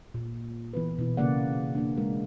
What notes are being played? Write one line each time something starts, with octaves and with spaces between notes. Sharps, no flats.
A#2
E3 B3 B4
B2 E4
C#3 A#3 D5 F#5
A#3 D4
G#3 A#4